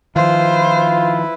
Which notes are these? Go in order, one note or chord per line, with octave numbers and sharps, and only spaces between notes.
D#3 F3 E4 F4 B4 C5